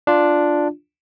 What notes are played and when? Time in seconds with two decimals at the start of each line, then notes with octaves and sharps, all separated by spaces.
0.07 D4 F4